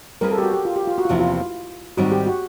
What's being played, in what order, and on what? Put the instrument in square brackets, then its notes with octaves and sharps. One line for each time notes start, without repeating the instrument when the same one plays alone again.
[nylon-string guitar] G3 C4 F4 G#4 B4 [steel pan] A#4
[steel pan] A4
G4
F#4
G4
F4
G4
F4
F#4
F4
[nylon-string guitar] E2 C3 F3 A#3 [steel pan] E4
[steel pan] F4
[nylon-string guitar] G#2 D#3 G3 C4 [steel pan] F#4
[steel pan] G4
F#4